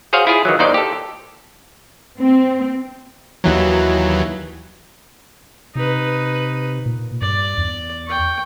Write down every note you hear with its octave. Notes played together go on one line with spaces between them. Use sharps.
F#4 G#4 C5 C#5 F5
E4 F4 G#4
D#3 E3 F#3
D#2 D#3 D#4 C5 D5
G4 A4
C4
D#2 E3 F#3
C3 D#4 B4
A#2
G2 D5
E2
G5 C#6